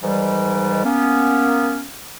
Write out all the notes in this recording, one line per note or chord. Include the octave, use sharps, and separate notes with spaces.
G#2 D#3 E3 G3
A#3 B3 C#4